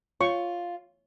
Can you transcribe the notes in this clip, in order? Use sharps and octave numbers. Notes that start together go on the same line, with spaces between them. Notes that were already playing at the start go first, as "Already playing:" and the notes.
F4 C#5 C#6